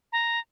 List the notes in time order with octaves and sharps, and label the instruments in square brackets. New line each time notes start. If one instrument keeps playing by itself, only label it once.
[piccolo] A#5